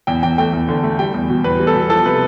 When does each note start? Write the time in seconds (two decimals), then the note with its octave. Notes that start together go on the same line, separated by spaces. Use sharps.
0.07 E2 G5
0.23 E2 G5
0.38 A3 G5
0.53 E2
0.68 D3
0.83 A3
0.99 G3 G5
1.14 E2
1.29 B2
1.44 E2 B4
1.59 G3
1.67 A4
1.75 B2
1.90 F3 A4
2.05 C3 B4